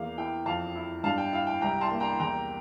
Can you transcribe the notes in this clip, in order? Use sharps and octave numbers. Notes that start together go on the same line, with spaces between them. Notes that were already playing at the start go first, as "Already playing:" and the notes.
Already playing: E2 A#3 F5
E4 G5
F2 F5 A5
E4
G2 F5 A5
G5
E4 F5
G5
C2 G5 A#5
A5 C6
A#3
G5 A#5
E2 G5 A#5